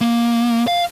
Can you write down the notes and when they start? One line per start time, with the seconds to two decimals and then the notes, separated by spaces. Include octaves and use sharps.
0.01 A#3
0.68 F5